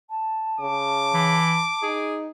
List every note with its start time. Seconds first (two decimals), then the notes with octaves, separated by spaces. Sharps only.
0.10 A5
0.60 C#3 D6
1.13 E3
1.82 D#4 G#4